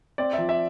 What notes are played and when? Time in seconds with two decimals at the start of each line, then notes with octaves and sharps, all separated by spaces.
0.18 C4 D5
0.33 F3 E5
0.49 E5